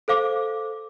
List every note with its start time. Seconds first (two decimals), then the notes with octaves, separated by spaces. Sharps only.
0.08 A4 C5 F5 D6